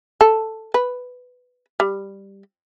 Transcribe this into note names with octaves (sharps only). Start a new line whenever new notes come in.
A4
B4
G3